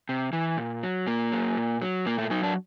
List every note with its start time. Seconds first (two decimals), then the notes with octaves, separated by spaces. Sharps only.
0.09 C3
0.33 E3
0.57 A#2
0.83 F#3
1.07 A#2 A#3
1.32 F#3
1.57 A#2
1.82 F#3
2.06 A#2 A#3
2.18 A3
2.30 F#3 D#4
2.43 D4